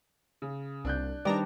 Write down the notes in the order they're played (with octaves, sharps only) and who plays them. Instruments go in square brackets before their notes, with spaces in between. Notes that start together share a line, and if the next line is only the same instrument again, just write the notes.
[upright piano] C#3
[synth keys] C2 [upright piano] D4 F#6 G6
[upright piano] D#3 B4 [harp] G3 D4 [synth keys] D5 A#5